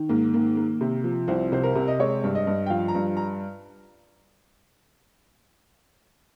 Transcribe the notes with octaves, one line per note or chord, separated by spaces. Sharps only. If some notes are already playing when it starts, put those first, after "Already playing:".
Already playing: D#3
G#2 A#3
D#3 A#3
A#3
C3
F3
C2 C4
C3 C5
A#4
C3
D#5
G#3 C#5
G2
D#5
G2
G5
F3 F5
A#5
G2
A#5